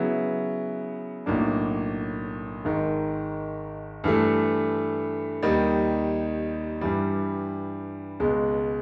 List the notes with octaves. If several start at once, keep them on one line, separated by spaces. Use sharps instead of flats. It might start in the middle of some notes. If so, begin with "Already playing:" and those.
Already playing: C#3 F#3 B3 E4
B1 A2 F#3 A#3 D4
G#1 G#2 D#3
G2 E3 A3
D#2 D#3 G3
G2 E3 G3
C#2 B2 G#3